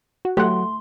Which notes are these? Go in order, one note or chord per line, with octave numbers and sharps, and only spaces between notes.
F#4
F#3 A3 G4 F#5 C6